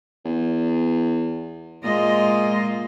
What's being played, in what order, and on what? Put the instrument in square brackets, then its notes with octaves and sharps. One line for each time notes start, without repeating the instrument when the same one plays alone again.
[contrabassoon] E2
[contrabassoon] A#2 [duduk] G#3 [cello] F4 D#5